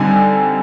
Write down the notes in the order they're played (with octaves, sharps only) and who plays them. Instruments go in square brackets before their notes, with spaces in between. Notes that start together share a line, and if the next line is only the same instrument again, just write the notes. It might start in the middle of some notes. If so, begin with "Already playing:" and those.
Already playing: [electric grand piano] D3 G3 C4 D#4 G#5